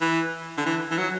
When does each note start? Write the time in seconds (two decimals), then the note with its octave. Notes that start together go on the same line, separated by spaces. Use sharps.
0.01 E3
0.58 D3
0.66 E3
0.91 E3
0.98 F#3